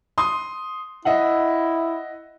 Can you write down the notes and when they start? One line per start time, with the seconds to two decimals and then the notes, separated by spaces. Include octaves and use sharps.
0.18 C6 D#6
1.05 E4 D#5 E5 F#5